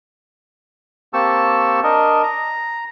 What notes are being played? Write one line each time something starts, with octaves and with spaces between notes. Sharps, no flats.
A#3 C4 G4 A5 C#6 E6
D4 A#4 D#5
A#5